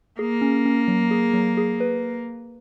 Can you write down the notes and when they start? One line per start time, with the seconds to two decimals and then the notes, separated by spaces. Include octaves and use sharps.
0.19 A#3 G#4
0.42 C#4
0.66 C#4
0.88 F#3
1.11 G#4
1.34 F#3
1.57 G#4
1.80 B4